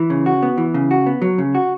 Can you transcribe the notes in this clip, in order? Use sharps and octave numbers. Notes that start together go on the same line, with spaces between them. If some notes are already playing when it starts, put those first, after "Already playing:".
Already playing: E3
C#3
F#4
B3
E3
C#3
F#4
B3
F#3
C#3
F#4